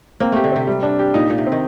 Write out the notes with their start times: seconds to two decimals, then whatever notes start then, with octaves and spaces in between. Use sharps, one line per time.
0.20 A#3 C4
0.32 A3 G4
0.44 D3
0.52 C3 C4
0.67 G3
0.83 D4
0.99 G4
1.14 A#2 D#4
1.30 A#2 D#4
1.38 C3
1.47 C4
1.52 D#3